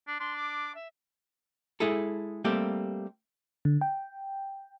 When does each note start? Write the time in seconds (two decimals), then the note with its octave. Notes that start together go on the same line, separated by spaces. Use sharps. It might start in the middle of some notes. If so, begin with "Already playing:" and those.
0.08 D4
0.20 D4 C6
0.36 D6
0.75 E5
1.80 G#3 E4 G#4 A4
2.45 G3 A3 A#3 C4 G4
3.65 D3
3.81 G5